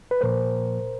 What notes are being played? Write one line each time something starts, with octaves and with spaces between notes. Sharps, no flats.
B4
A#2 F3 A#3 A#4 C5